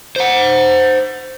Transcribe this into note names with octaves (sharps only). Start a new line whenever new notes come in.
C5 F#5